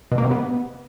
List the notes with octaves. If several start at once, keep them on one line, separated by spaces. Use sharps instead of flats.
B2
A#3
C3
B3